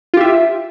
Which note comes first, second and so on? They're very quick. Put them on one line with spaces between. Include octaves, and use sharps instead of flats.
F4 G4 E5